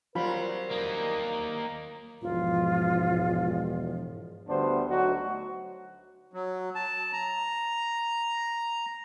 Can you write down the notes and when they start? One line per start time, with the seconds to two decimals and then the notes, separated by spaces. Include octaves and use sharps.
0.15 F#3 G3 C4 F4 A#4 B5
0.71 A#3 D#4
2.22 E1 G#2 F3 F4
4.48 D2 D3 G3 B3 D4 C5
4.88 D2 F#3 D#4 F#4
6.33 F#3
6.75 A5
7.13 A#5